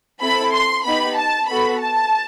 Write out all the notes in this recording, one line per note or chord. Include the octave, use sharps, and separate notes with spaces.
C4 E4 A4 B5
C6
B3 D#4 G4 B5
A5
B3 F#4 A4 B5
A5